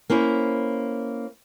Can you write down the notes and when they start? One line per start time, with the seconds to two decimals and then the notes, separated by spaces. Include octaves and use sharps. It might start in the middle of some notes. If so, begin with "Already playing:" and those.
0.10 A#3 C#4 E4 C5